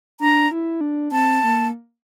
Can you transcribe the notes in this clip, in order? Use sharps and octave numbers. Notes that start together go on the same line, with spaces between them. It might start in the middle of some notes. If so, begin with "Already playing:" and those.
D4 A#5
E4
D4
C4 A5
A#3